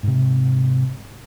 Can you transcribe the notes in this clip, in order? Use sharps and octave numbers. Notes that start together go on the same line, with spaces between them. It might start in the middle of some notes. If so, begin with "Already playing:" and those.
G#2 C3